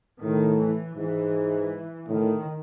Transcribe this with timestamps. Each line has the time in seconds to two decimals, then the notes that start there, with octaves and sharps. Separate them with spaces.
0.22 A2 D#3
0.59 E3
0.96 G#2 E3
2.08 A2 D#3